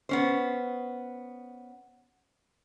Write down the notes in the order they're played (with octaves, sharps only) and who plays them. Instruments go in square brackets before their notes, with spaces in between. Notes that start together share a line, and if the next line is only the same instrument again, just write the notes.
[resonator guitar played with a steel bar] B3 C#4 C5